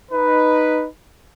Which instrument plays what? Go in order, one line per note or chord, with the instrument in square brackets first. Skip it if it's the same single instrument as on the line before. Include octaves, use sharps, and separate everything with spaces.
[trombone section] D#4 B4